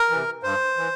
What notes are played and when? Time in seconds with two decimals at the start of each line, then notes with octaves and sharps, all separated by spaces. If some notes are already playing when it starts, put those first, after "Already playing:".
Already playing: A#4
0.10 C3 E3
0.43 G2 C5
0.77 E3